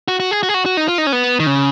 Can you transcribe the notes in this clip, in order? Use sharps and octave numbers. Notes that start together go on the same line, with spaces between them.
F#4
F#4
G#4
F#4
G#4
F#4
F#4
D#4
F4
D#4
C#4
B3
D#3
C#3